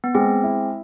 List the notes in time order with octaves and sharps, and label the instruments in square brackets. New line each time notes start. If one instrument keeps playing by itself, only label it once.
[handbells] B3
[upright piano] G#3 [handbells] C4
[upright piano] E4